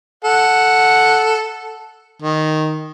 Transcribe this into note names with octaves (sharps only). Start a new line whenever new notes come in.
A4 F#5
D#3